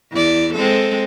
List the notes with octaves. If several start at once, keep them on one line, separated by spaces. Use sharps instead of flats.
E2 E4 D5
G#3 C4 A4